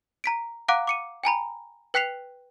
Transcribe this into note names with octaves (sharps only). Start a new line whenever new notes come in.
A#5 B6 D7
F5 F#5 A#5 D6 F#6 D7
D6 C#7 D#7
G5 G#5 A#5 B5
B4 G5 F#6 B6 C7 F7